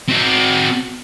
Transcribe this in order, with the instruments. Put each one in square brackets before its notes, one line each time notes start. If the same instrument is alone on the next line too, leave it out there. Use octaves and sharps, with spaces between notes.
[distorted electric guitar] C4 F#4